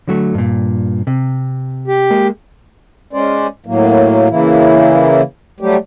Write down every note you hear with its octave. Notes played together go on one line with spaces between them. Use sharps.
D3 F#3 A3
G2 A#2
C3
G4
G#3 A#3
G#3 C#4 C5 D5
A2 F#3 A#3
C#3 E3 A#3 E4
F#3 G3 A3 G4